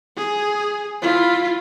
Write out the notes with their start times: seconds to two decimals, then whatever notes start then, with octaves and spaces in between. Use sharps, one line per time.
0.17 G#4
1.01 E4 F4